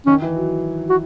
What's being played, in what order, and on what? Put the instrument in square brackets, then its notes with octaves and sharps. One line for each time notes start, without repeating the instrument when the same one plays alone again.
[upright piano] D#3 [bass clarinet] C#4
[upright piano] E3
F#3
[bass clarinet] F#4